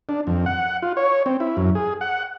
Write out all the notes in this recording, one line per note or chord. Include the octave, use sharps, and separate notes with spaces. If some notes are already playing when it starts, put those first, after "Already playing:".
D4
F2
F#5
F4
C#5
C4
E4
F#2
G#4
F#5